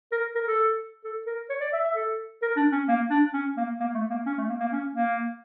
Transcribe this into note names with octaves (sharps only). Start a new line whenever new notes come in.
A#4
A#4
A4
A4
A#4
C#5
D5
E5
E5
A4
A#4
D4
C#4
A#3
D4
C#4
A#3
A#3
A3
A#3
C#4
A3
A#3
A#3
C#4
A#3